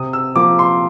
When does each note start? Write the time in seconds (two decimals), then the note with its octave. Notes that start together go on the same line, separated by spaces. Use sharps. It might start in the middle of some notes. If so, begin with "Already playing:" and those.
Already playing: C3 D#6
0.13 E6
0.35 F3 A#3 D6
0.59 C6